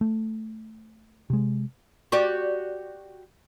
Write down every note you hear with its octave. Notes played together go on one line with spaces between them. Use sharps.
A3
C3 G#3
F#4 G4 D5